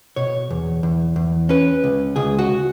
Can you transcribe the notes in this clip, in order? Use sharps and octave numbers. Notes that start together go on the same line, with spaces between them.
B2 C#5
E2
E2
E2
C#4 B4
C#2
C#2 G#4
F#4